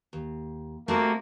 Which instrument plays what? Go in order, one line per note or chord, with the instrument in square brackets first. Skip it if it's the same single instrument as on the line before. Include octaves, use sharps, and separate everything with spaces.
[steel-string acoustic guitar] D#2
[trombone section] C3 A#3 [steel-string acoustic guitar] A3 F#4 A#4